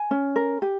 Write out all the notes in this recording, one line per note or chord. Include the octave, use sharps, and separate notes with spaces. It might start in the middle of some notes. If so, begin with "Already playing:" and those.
Already playing: G#5
C#4
A#4
G4